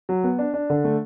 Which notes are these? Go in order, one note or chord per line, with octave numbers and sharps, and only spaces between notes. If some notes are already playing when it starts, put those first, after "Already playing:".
F#3
B3
D4
D4
D3
A3